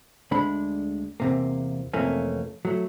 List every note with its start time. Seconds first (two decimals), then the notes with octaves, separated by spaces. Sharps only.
0.31 D2 D3 G#3 D4 B5
1.20 E2 C3 A#3
1.93 F2 C3 E3 A3 A#3 C#4
2.65 F#3 A3